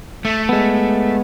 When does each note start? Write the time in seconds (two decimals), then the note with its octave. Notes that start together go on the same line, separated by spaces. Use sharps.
0.25 A3
0.49 G#3 B3